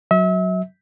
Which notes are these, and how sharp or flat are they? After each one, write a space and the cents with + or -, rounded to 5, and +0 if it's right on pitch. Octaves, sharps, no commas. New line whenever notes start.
F#3 +0 E5 -35